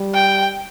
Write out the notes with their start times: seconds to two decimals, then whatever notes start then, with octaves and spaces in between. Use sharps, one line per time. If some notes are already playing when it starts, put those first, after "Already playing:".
Already playing: G3
0.14 G5